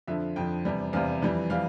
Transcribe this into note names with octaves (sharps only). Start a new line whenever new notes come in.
F2 D3 F3 E5
F2 D3 F3 G5
E2 C3 G3
E2 C3 G3 F5
F2 E3 G3
E3 G3 F5